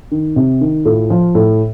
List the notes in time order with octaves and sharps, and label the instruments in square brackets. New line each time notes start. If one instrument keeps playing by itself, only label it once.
[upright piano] D#3
C3
D#3
A2 F4 A4
F3
A2